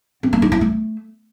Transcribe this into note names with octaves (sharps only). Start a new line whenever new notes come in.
C4
A#3
D#4
E4
A3